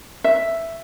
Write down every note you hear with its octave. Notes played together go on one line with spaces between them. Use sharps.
E5